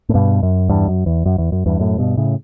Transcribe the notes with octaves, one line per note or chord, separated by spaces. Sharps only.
A2
G2 B2
F#2
E2 G2
F#2
E2
F#2
E2
F#2
E2 G2
F#2 A2
G2 B2
A2 C#3